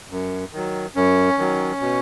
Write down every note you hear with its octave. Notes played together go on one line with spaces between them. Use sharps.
F#2
D#3 F#3
F#2 C#4
D#3 F#3
B2